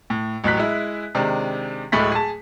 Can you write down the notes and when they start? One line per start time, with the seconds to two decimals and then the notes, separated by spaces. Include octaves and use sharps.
0.10 A2
0.44 A1 A2 F#3 F#6 B6
0.57 G#3 E4
1.15 C3 D#3 G#3 D4
1.92 D1 A2 G#3 A3 B5 B6
2.12 G#4 A5